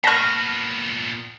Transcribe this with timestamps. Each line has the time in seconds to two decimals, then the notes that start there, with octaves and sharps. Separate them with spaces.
0.04 A#2 B3 A5 C#6 F6 A#6